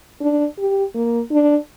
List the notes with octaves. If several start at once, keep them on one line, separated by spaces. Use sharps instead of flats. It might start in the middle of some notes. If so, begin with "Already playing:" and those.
D4
G4
A#3
D4